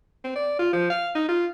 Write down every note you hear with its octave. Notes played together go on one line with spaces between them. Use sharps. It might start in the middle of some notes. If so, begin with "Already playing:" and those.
C4
D5
F4
F3
F5
D#4
F4